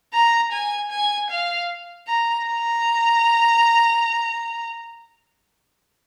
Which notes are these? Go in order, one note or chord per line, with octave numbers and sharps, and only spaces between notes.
A#5
G#5
G#5
F5
A#5
A#5